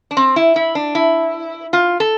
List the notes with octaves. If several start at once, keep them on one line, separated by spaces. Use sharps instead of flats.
D4
C4
E4
E4
D4
E4
F4
A4